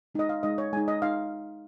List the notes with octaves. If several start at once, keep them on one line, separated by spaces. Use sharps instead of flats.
G#3 D#4 D#5
F5
G#3 D#4 D#5
C#5
G#3 D#4 G#5
D#5
D#4 F5